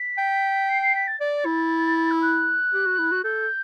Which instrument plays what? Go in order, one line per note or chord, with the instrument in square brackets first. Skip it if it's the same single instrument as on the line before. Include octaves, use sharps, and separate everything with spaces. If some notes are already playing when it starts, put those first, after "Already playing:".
Already playing: [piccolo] B6
[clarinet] G5
[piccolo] C7
C7
B6
A6
[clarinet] D5 [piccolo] A6
[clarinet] E4
[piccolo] E6
F#6
[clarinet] G4
F#4
E4
F#4
[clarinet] A4 [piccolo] G6